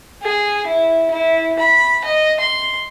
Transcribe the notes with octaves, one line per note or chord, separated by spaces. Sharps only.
G#4
E4
E4
B5
D#5
C6